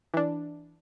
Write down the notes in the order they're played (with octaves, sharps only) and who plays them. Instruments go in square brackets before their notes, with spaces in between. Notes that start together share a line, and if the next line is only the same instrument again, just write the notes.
[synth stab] E3 D4